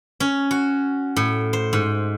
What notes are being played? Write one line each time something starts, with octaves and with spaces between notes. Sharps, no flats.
C#4
F#4
A2
C5
G#2